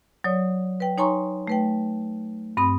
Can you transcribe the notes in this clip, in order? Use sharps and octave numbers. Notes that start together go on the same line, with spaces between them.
F#3 C#5 D5 D#6
B4 G5
D#4 C#5 G#5 A#5 C6 C#6
A3 B4 G5
G2 C4 B5 D#6